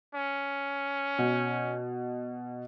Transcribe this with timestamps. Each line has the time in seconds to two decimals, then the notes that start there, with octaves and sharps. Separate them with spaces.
0.15 C#4
1.19 B2